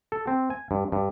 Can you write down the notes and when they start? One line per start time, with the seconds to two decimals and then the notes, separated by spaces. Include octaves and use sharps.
0.12 A4
0.27 C4
0.50 G#5
0.71 G2
0.92 G2